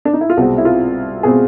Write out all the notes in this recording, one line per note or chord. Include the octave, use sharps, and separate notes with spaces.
D4
D#4
E4
F4
C2 B2 G#3 C4 F#4
E4
F4
B2 G#3 C4 G#4